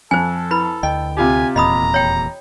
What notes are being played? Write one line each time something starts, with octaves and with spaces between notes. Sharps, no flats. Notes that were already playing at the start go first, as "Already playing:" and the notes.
F2 A4 C5 G#5
E4 B4 B5
D2 D#5 G5
C3 F4 G4 G#5
D#1 E2 A#2 D#5 A#5 B5 D#6
C#5 G5